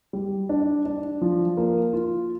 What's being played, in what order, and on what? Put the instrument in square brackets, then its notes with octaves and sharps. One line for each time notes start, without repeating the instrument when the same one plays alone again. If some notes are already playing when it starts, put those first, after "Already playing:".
[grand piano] G3
D4
D4
F3
A#3
F4